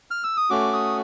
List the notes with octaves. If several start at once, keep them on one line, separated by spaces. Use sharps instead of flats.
F6
E6
D#6
A3 C#4 F#4 D6
D#6